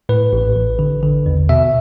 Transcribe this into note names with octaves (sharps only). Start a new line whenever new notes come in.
A2 B4
A1
A1
D3
D3
E2
B2 E5